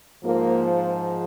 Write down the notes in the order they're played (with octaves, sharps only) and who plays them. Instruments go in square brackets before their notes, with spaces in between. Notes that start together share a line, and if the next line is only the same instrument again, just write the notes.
[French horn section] G#2 F3 A#3